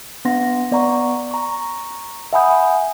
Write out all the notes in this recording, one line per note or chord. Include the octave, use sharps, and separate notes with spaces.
B3 D4 F#5 C6 A#6
B3 D5 F#5 A#5 C#6
A#5 C#6
E5 F#5 G#5 B5 D#6 G6